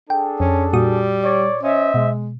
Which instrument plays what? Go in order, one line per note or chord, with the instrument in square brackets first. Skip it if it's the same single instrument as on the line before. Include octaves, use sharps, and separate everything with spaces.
[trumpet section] D4 G#4 A4 [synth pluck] G5
[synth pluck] F2 [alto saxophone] C#4
[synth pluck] A#2 F#4 D#6 [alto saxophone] G3
[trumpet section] C#5 D5
[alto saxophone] C#4 [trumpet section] C5 D#5 E5
[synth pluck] B2 [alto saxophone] G#3